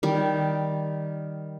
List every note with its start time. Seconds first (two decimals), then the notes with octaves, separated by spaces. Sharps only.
0.03 D#3 G3